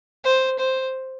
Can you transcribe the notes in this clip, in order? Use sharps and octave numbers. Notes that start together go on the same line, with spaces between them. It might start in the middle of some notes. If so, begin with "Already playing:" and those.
C5
C5